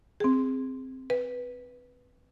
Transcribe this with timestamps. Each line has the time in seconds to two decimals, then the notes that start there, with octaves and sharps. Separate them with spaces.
0.20 C4 G#4
1.10 B4